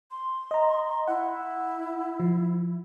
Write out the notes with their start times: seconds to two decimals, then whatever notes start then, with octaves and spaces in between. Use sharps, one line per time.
0.11 C6
0.51 D#5 A#5
1.07 E4 F#5
2.20 F3